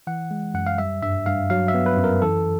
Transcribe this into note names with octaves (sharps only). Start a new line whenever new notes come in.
E3 F#5
G#3
F#2 F#5
F5
G3 E5
G2 E5
G2 F5
F#3 F5
E5
B3
B4
F#2
A#4
E3 A4